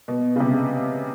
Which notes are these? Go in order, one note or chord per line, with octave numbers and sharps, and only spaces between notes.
B2
C#3
C3